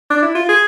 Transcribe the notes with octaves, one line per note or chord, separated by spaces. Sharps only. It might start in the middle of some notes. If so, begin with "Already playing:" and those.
D4
E4
F4
G#4